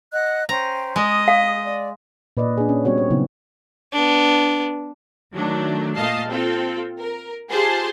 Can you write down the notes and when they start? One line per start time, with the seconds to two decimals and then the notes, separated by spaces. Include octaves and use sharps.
0.13 D#5 F#5 F#6
0.49 C#4 C5 G5 A#5
0.96 G#3 D#5 D#6
1.28 F5
1.63 D5
2.37 A#2 B4 D5 D#5
2.57 D4 G#4
2.69 C#4
2.84 G3 B3 C4 F#4 C#5 F#5
2.98 C#5
3.10 C#3 F#3 B3 D#4 E4
3.92 B3 D4
5.33 D#3 F#3 A3 D4
5.96 A#2 A3 D#5 F5 A5 C7
6.29 C4 F4 A4
6.99 A#4
7.50 F4 G4 G#4 C5 A5 C6